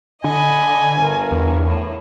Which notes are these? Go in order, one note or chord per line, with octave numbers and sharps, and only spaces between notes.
D3 D#5 F#5 G#5 B5
G1 A#4
E2
A2